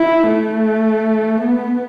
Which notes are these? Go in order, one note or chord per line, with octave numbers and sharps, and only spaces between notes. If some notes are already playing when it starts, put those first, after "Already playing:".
Already playing: E4
A3
B3